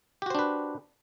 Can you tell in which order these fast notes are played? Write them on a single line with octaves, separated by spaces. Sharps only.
G4 F#4 C5 D4 B4